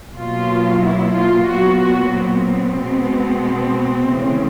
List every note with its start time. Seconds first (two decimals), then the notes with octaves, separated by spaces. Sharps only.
0.15 B2 F#3 A#3 F4
0.82 E4
1.15 F4
1.47 A#2 F#3 B3 F#4
1.80 F#4
2.14 C4
2.79 B2 G#3 B3
4.11 C#3 E3 A3